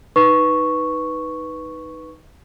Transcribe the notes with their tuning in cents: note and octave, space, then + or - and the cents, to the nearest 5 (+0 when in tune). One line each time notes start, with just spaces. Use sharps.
D#4 +5 B4 +0 C#6 +0